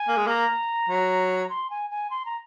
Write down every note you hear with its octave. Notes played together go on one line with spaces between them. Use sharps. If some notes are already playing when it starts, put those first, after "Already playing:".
Already playing: G#5
A#3
G#3
A#3 A#5
F#3
A#5
C6
G#5
G#5
C6
A#5